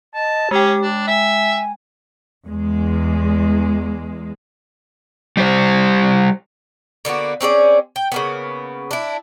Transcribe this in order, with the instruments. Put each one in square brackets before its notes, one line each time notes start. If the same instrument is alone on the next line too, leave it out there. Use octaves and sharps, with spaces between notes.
[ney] D#5 [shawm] A5
[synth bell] G#3 G5 [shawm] C#4 [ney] G4
[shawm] D4
[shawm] E5 [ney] G#5
[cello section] E2 G#3
[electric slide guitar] G3 G4 C5
[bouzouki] D3 A#3 B3 F#4
C4 C#4 G#4 D5
G5
C#3 A#3 B3
D4 E4